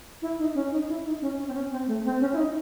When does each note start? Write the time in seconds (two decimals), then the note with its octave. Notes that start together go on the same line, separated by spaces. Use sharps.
0.22 E4
0.39 D#4
0.54 C#4
0.71 D#4
0.88 E4
1.05 D#4
1.21 C#4
1.38 C#4
1.48 C4
1.54 C#4
1.71 C4
1.87 A3
2.04 C4
2.20 C#4
2.33 E4
2.37 D#4